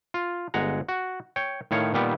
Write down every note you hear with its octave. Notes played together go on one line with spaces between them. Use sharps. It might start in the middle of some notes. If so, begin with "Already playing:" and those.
F4
G1 G#3 F#5 A#5
F#4
C#5 G5
A2 D#3 C#5 F5
A#2 D#3 G3 B3 G4